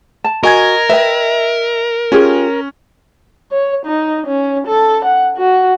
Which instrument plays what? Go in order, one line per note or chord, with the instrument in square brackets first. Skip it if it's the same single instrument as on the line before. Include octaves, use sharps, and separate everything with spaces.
[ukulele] A5
[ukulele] F#4 [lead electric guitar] A#4 [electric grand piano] D#5 G#5 G#6
[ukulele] B4 D#5 G5 [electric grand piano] E5
[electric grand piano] C#4 [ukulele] F4 G4 G#4
[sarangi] C#5
D#4
C#4
A4
F#5
F#4